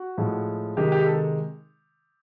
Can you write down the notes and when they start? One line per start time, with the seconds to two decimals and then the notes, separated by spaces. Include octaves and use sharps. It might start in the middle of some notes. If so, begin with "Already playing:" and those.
Already playing: F#4
0.18 A2 F3 G#3
0.77 C3 D#3 G#3 G4
0.92 G4
1.06 A4